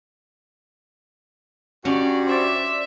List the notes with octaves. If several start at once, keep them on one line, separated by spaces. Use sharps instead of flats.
G2 C#4 F#4 D5
C5 D5 E5